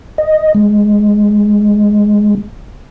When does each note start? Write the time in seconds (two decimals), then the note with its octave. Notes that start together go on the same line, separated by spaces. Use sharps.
0.18 D#5
0.55 G#3